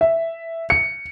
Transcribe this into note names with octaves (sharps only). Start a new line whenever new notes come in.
E5
C#7